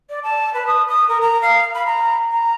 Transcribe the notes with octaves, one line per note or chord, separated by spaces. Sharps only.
D5
A5
B4
D#6
D#6
A#4
A#5
F5
B5
A#5
A#5